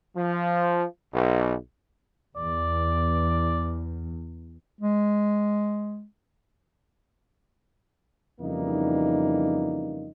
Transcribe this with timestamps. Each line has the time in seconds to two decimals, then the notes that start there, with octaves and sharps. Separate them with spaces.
0.16 F3
1.13 B1
2.37 E2 D5
4.81 G#3
8.41 F2 C#3 E3 G3 A#3 D#4